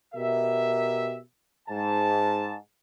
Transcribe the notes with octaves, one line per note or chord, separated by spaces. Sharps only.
B2 G4 A#4 E5
G#2 A5